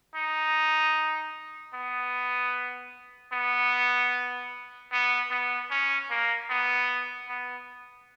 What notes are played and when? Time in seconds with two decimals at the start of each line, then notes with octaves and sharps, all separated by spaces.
0.16 D#4
1.74 B3
3.33 B3
4.92 B3
5.31 B3
5.71 C#4
6.11 A#3
6.50 B3
7.29 B3